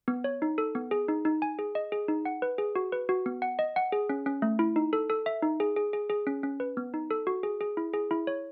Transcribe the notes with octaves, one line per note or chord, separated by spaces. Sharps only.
B3
C#5
D#4
A4
B3
G#4
D#4
D#4
G#5
G#4
D#5
G#4
D#4
F#5
B4
G#4
F#4
B4
F#4
B3
F#5
D#5
F#5
G#4
C#4
C#4
A3
E4
D#4
A4
A4
E5
D#4
G#4
G#4
G#4
G#4
C#4
C#4
B4
B3
D#4
A4
F#4
G#4
G#4
E4
G#4
E4
C#5